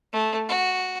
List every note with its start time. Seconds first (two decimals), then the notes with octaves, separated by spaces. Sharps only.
0.13 A3
0.49 F#4